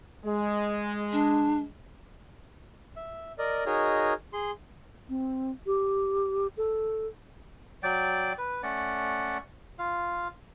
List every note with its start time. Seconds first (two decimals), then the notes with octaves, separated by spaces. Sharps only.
0.25 G#3
1.12 D4
2.96 E5
3.39 A#4 D5 D#5
3.66 D#4 F#4 G#4 A#4 C#5 D#5
4.33 G#4 C6
5.09 C4
5.66 G4
6.57 A4
7.83 F#3 D5 G5
8.38 B4
8.63 A3 C#4 D5 F#5
9.79 F4 F5